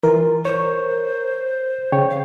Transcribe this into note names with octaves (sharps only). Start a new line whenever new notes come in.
E3 F4 A#4
C5 C#5 C#6
C#3 C#5 G5
F5